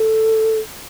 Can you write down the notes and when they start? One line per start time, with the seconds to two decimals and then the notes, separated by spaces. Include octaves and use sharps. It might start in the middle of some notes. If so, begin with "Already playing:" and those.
Already playing: A4